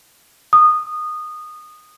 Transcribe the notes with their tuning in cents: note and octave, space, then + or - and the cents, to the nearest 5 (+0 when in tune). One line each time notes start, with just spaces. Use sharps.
D#6 -20